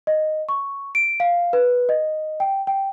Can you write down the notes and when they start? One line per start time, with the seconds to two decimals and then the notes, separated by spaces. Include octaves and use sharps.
0.07 D#5
0.49 C#6
0.95 D7
1.20 F5
1.53 B4
1.89 D#5
2.40 G5
2.67 G5